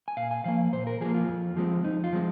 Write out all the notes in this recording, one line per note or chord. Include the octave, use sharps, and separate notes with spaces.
G#5
A#2 F5
G#5
F3 A#3 F5
A#2 C5
A#4
F3 A#3 G#4
F4
F2
F3 G#3 C4
F2 D#4
F4
F3 G#3 C4